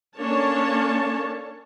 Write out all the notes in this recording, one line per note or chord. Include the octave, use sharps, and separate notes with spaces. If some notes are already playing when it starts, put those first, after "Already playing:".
A#3 C#4 D4 A4 C#5 A5